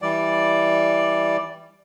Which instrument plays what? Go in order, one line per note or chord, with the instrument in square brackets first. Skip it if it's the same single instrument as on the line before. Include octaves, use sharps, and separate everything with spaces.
[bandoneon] E3 G3 D5